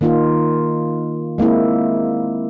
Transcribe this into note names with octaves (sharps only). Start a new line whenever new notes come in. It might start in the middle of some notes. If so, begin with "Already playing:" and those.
D#3 A#3 D#4 F4
G#3 A#3 C4 E4